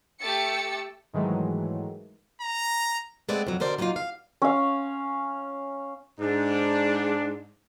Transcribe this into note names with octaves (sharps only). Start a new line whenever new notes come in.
A3 G4 E6 A6 C#7
G#2 D#3 E3 F#3 G#3 A3
A#5
G#3 A3 B3 C4 D5
F2 F#3
B2 D3 A#4 C5 D5
F#3 G3 A#3 D#4 F4
F5
C#4 F5
G#2 D4